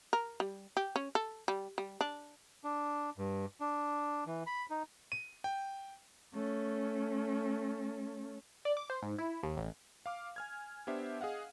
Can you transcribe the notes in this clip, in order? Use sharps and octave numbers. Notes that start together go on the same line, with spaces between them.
A#4
G3
G4
C#4
A4
G3
G3
D4
D4
G2
D4
E3
B5
D#4
D#7
G5
A3 C#4
D5
D6
C5
G#2
E4
D#2
A1
F5 D6 F6
G#5 F6 G#6
B3 D4 G4 C5 E5
G#4 D#5 F5 F#5